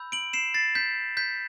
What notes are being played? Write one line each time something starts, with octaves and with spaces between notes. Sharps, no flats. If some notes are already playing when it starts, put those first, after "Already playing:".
Already playing: B5 E6 G6
D7 F#7
C7 E7
A6 C7
G6 B6
G6 B6